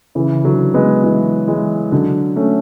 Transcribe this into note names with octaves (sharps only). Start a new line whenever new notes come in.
C#3 E3
D3 F#3
G#3 B3
E3 G#3
E3 G#3
D3 F#3
A3 C#4